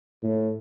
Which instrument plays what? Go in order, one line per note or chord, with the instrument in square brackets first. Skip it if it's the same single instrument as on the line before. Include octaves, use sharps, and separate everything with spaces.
[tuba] A2